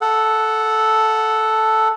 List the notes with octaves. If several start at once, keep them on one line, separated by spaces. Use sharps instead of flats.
A4 F#5